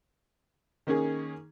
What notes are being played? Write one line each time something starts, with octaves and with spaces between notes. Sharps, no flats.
D#3 A#3 C#4 G#4